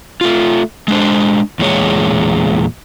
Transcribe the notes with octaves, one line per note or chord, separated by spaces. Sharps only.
A3 F4
G#3 D4 C5
E2 A#2 G#3 C#5